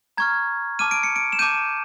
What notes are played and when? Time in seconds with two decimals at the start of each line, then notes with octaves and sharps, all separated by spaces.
0.17 A#5 C#6 F6 G#6
0.79 A5 D6 F6 D#7
0.91 D7
1.03 C#7
1.16 D7
1.32 E7
1.39 A5 D6 G6 D#7